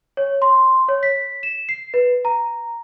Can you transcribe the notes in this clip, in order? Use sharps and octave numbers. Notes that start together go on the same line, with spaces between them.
C#5
C6
C#5
B6
E7
C7
B4
A#5